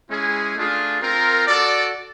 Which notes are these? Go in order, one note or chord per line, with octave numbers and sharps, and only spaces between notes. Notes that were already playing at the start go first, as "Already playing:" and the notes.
G#3 C#4 E4 G#4
A3 D4 F4 G#4
C4 F4 A#4
F#4 A4 D5